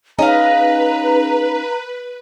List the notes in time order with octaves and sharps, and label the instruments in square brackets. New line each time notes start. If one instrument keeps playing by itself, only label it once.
[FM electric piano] C#4 D#4 G#4 [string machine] B4 [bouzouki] D#5 F5 [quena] A#5